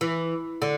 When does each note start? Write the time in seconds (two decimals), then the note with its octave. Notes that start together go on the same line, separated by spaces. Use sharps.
0.01 E3
0.62 D3